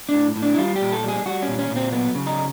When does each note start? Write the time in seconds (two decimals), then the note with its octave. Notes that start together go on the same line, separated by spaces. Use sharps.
0.09 D4
0.14 A2
0.36 A2
0.42 D4
0.54 E4
0.58 G3 F4
0.76 G4
0.81 A#2
0.92 A4
1.04 G3 G#4
1.26 G3 F#4
1.42 C#4
1.48 A#2
1.59 C#4
1.70 A#2
1.76 C4
1.92 F#3 B3
2.15 C#3
2.27 D#4